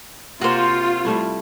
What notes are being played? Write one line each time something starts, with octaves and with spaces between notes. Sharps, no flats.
C3 A#3 F4 F#4 C5
G3 A3 E4